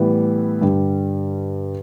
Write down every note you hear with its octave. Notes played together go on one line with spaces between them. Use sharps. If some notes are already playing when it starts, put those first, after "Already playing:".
Already playing: A2 E3 G3 B3
G2 D3 G3